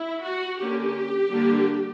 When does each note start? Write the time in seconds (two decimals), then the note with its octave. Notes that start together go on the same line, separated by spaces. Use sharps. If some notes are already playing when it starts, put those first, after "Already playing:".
Already playing: E4
0.23 F#4
0.59 D3 A#3 C#4 G4
1.31 D3 G3 A#3 D4